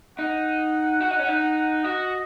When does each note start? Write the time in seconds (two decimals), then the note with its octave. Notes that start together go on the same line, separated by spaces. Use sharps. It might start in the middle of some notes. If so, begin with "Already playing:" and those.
0.18 D#4 F#5
1.01 F#4
1.11 D#4
1.19 C#4
1.28 D#4
1.84 F#4 D#5